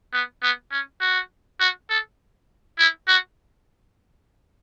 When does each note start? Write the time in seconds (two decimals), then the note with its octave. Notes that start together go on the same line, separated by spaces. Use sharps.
0.13 B3
0.42 B3
0.71 C#4
1.01 F#4
1.60 F#4
1.89 A4
2.79 E4
3.08 F#4